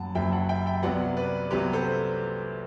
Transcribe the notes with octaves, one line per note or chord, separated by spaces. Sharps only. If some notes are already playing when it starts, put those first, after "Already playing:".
Already playing: F#1 F#2 F#3 F#5 A5
F#1 F#2 F#3 E5 G5
F#5 A5
E5 G5
E5 G5
C2 C3 F#3 B3 D5 F#5
B4 D5
C2 C3 F#3 B3 G4 B4
A4 C5